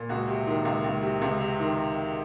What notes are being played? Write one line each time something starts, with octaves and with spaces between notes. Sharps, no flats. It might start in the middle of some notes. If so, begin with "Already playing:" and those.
Already playing: A#2
C#2 F#4
C3
D#3
C#2
C#2
C3
C#2
C3
D#3